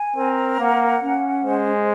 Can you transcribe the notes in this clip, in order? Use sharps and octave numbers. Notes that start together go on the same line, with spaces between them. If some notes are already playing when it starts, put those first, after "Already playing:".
Already playing: G#5
C4 A#4
A#3 F#5
C#4
G#3 C5